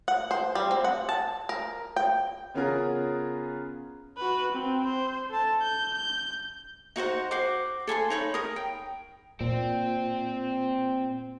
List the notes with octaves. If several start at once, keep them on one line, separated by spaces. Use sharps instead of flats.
F#5
C5
G3
C4
F#5
A5
A#4
G5
C#3 B3 C#4 F4 G#4 A#4
F#4 B4
C4
C5
A4 A5
G6
G6
D#4 F#4 C5 F#5
F#4 C5 D6
A4 G#5 B5 C6
D#4 C#5 B5
A#4 D#6
G5
A#2 C4